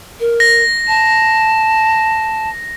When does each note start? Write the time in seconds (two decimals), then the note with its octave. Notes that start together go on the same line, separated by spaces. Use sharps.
0.20 A#4
0.40 A#6
0.88 A5